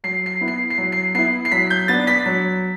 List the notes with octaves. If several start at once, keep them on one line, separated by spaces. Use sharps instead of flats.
F#3 C7
C7
B3 E4
C7
C7
F#3
C7
B3 E4 C7
C7
F#3 B6
G6
B3 D4 A6
B6
F#3